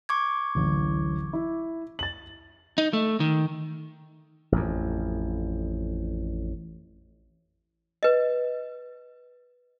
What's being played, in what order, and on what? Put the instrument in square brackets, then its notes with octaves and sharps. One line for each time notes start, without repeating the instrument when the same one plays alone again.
[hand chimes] C#6 D6 G#6
[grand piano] D1 A1
E4
A6 F#7
[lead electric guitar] D#4
A3
D#3
[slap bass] A1 F2
[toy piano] B4 D#5